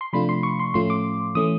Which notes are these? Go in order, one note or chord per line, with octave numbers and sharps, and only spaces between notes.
C6
C3 F3 A3 D4 F4 B5
C6
C#6
C6
A2 F3 A3 C#4 F4 C6
D6
E3 A3 C#4 D#6